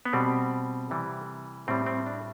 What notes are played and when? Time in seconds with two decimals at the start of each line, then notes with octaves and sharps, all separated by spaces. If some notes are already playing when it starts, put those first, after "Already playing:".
0.05 B3
0.13 B2 G3 C4
0.90 C3 E3 G3
1.68 A2 G3 C4
1.86 C4
2.06 D4